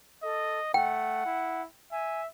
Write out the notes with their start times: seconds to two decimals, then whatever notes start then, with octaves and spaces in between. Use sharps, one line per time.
0.23 A4 D#5
0.74 A3 F#5 G5
1.26 E4
1.92 E5 G#5